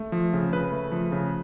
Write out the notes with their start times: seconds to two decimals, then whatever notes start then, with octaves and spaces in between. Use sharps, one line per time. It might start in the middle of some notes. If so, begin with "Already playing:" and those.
Already playing: A3
0.12 F3
0.33 C#3
0.53 C#3 B4
0.72 A3
0.92 F3
1.12 C#3